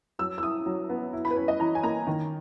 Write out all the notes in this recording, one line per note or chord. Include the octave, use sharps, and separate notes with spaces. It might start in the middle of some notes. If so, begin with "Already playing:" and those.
F#3 E6
E6
E4 D#6
F#3
B3
E4
B5
B4
C#4 C#5
D#5
E3 A#5
G#5
A#3 A#5
D#3